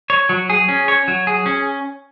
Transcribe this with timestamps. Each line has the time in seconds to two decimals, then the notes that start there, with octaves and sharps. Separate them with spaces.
0.10 C#5
0.29 F#3
0.50 G#4
0.69 C#4
0.88 C#5
1.08 F#3
1.27 G#4
1.46 C#4